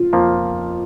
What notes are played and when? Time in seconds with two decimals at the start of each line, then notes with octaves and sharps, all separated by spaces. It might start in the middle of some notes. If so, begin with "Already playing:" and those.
Already playing: F4
0.13 F2 F3 A#3